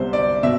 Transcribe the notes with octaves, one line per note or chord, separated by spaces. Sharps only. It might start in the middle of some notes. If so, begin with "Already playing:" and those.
Already playing: C2 C3 G3 B3 C5
D5
B2 E5